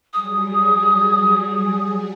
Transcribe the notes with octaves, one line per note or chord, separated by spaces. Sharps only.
F#3 G3 G#4 D#6